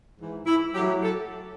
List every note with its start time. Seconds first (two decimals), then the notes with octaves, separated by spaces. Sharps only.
0.18 G#2 E3
0.46 E4
0.74 F#3 G4
0.78 A2
1.02 A4